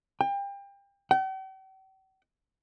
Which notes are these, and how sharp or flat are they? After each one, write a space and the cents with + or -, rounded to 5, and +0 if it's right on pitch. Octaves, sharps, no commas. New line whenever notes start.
G5 +30
G5 -45